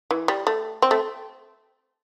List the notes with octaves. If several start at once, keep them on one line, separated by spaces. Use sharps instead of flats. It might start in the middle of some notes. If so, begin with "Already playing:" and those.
E3
G3
A3
C4
A3